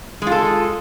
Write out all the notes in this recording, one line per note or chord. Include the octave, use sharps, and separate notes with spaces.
G#3 F4 A4